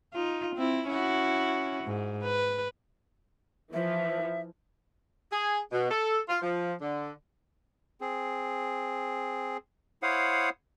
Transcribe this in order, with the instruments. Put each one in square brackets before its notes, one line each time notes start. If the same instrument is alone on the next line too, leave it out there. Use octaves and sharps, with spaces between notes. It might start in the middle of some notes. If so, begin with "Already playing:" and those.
[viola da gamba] D#4 F4
C4 E4
C#4 E4 F#4
G#2
B4
[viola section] E3 F3 [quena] E5
[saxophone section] G#4
B2
A4
F4
F3
D3
[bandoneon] C4 G#4
E4 C5 C#5 F5 F#5 D#6